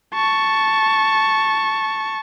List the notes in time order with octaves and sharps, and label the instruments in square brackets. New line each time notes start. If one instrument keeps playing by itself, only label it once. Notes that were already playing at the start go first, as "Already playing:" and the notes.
[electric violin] A5 C#6